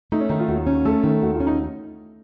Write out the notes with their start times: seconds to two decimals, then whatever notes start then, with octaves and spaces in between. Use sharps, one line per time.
0.12 A3 D#4
0.20 C#4
0.30 D#3 D#4
0.39 F4
0.48 D#2 F#4
0.67 C#4
0.85 A3 A4
1.04 D#3
1.22 D#2 F#4
1.35 F4
1.40 C#4
1.47 D#4